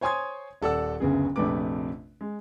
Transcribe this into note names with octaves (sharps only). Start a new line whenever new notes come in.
C5 C#5 G#5 C6 D#6 G#6
D#1 A4 D5 F#5 E6
F#1 D2 C#3 B3 G#4
A#1 F2 C3 A3 B4 D6
G#3